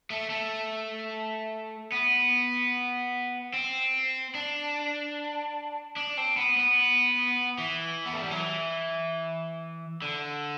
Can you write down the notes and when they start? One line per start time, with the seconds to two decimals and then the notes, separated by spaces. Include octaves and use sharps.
0.10 A3
0.30 A3
1.92 B3
3.54 C4
4.35 D4
5.96 D4
6.17 C4
6.37 B3
6.57 B3
7.58 E3
8.06 B3
8.13 A3
8.22 G3
8.31 F#3
8.39 E3
10.02 D3